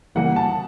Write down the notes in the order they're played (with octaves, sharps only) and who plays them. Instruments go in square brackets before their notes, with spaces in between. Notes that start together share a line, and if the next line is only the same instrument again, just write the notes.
[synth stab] C#3 E3 G3 A#3 [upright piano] F#5
[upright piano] A5